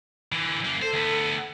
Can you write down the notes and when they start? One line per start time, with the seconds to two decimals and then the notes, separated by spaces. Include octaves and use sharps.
0.32 D3 E3
0.64 F#2 A#3
0.82 A4 C5
0.93 D2 B3